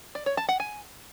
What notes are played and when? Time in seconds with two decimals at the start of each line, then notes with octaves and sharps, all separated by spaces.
0.15 D5
0.26 C#5
0.37 A5
0.49 F#5
0.60 G#5